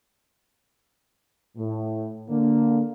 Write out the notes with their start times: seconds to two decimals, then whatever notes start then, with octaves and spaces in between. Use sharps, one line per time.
1.56 A2
2.29 D3 A#3